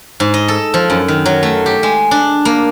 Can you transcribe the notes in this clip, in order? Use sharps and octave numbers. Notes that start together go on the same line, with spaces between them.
G#2
D#5
A4
F3
F#2
D#3
F#3
A3
G4
G#3
D4
A#3